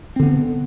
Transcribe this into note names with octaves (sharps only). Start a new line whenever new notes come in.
D3 B3 C4